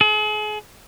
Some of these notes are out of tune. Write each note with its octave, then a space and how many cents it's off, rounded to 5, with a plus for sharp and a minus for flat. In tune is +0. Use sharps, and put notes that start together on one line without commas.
G#4 +40